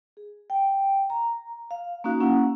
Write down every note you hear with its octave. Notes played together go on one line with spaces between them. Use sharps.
G#4
G5
A#5
F5
A#3 C#4 D#4 F#4 F5
A#3 C#4 E4 F#5